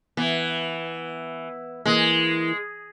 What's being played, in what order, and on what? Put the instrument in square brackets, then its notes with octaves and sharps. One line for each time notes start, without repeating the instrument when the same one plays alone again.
[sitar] E3 [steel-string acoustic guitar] B3
[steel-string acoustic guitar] E3 A#3 [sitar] G#3